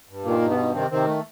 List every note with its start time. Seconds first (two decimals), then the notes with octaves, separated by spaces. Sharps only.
0.09 G2
0.24 A#2 D#3 A#3
0.41 G2
0.50 B2 B3
0.58 D#3
0.74 C3 D#3 C4
0.90 C3 D#3 C4
1.07 A3